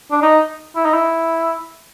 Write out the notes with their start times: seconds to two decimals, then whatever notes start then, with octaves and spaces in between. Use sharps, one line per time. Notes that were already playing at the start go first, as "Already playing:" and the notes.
0.11 D4
0.22 D#4
0.76 E4
0.85 D#4
0.94 E4